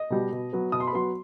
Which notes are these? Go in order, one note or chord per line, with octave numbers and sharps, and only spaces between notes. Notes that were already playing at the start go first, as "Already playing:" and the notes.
Already playing: D#5
B2 G3
B2
F#3 B3
B2 D#6
C6
B5
F#3 B3 C6